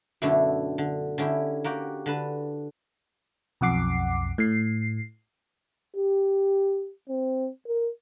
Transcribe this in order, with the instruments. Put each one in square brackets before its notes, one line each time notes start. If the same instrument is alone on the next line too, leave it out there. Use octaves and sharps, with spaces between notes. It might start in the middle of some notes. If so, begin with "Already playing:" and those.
[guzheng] F#2 B2 D3 A3 D4 E4
D3
D3 C#4 E4 G4
A#3 F#4 G4
D3 B4 A5
[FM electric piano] B1 F2 F#5 D6 C7
A2 C7
[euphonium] G4
C4
A#4